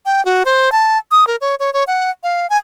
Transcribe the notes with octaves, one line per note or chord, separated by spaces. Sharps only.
G5
F#4
C5
A5
D#6
A#4
C#5
C#5
C#5
F#5
F5
G#5